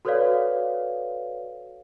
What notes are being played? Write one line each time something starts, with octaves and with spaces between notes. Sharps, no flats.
F#4 A4 B4 C#5 D5 F5